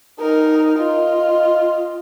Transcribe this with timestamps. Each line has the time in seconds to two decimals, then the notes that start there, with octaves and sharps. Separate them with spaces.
0.20 D#4 A#4
0.79 F4 D#5